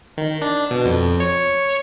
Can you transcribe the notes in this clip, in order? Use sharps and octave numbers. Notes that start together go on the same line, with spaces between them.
D#3
D4
B2
F2
C#5